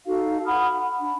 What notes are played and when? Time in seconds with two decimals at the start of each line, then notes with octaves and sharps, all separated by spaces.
0.06 D#4 F#4 A4 F5
0.45 F#5 B5 D#6 F6
0.78 B5
0.99 D4